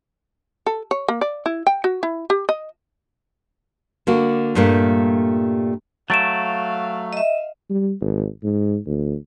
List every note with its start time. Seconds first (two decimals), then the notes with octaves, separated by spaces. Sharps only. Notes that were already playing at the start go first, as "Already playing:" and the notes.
0.66 A4
0.91 C#5
1.08 A#3
1.21 D5
1.46 E4
1.67 G5
1.84 F#4
2.03 E4
2.30 G4
2.49 D#5
4.07 D3 A#3 F#4
4.55 G2 A#2 G3 A3 A#3
6.10 F#3 A3 F5 A6 D7 E7
7.13 D#5 E5
7.69 G3
8.01 G#1
8.43 G#2
8.86 D2